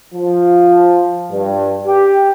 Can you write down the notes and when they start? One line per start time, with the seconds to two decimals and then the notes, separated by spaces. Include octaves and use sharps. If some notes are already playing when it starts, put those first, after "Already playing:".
0.14 F3
1.31 G2
1.86 G4